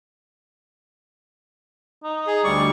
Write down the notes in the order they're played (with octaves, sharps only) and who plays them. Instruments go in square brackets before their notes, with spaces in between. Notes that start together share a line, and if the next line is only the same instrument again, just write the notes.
[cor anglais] D#4
[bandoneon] G#4
[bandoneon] D2 G3 C#6 [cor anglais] D5